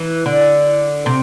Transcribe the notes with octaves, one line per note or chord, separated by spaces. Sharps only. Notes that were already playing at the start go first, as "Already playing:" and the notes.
Already playing: E3
D3
C3